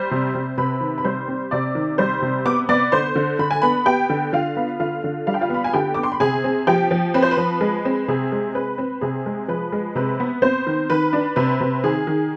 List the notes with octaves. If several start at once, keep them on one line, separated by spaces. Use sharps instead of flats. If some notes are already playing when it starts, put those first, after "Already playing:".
Already playing: G3 C5 C6
C3
C3
C3 B4 B5
D#3
B5
G3 C5 C6
C4
C3 D5 D6
D#3
G3 C5 C6
C3
B3 D6
B3 D5 D6
D3 C5 C6
D3
D3 B5
G#5
B3 B4 B5
B3 G4 G5
D3
D3 F4 F5
B3
D3 F4 F5
D3
G3 F5
G5
F4 F5
B3 B5
G#5
D3 G4 G5
B3 D6
C6
B5
C3 G#4 G#5
C4
F3 G4 G5
F3
C4 B4
C5
B4
F3
G#3
C4
C3 G#4
G#3
C4 B4
C4
C3 G#4
G#3
F3 B4
G#3
C3 B4
B3
B3 C4 C5
D#3
D#3 B4
D4
C3 B4
C3
D#3 G#4
D#3